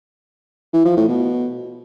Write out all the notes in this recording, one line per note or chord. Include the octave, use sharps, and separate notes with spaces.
E3
F3
A2
B2